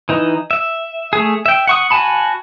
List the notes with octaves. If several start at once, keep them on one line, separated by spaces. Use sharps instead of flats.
E3 D#4
E5
A3 G#4
E5 G5
F#5 C#6 D#6
F#4 G#5 A5 B5